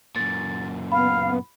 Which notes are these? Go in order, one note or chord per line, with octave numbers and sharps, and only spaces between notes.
F#2 A#2 A6
B3 F5 B5